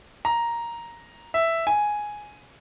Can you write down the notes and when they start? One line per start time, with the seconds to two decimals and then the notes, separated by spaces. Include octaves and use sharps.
0.25 A#5
1.34 E5
1.67 G#5